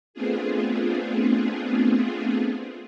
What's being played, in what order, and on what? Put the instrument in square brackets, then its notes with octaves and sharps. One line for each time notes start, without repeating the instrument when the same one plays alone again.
[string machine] A3 B3 C4 D4 F4 G#4